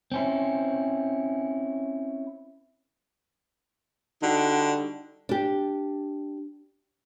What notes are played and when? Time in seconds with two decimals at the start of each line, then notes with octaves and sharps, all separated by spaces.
0.12 C4 C#4 E4
4.22 D3 G3 D#4 F#4
5.29 D4 G4